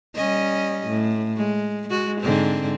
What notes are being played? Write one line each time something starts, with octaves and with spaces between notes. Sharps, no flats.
G3 C#4 D#5
A2
G#3
G#3 F#4
G#2 D3 C4